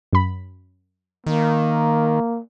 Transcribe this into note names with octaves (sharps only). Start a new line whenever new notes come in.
F#2 B5
D#3 A#3